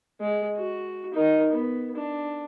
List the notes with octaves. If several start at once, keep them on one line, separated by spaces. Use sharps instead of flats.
G#3
F#4
D#4 A#4
B3
D4